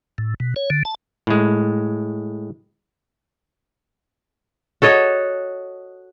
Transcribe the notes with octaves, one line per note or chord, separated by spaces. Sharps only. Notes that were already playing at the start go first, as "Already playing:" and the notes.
A2
B2
C#5
D3
A5
A2 G#3
F#4 A4 C#5 D#5